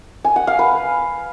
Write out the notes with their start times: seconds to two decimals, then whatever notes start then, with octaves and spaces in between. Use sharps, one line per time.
0.24 G#5
0.36 F#5
0.47 F5
0.59 B4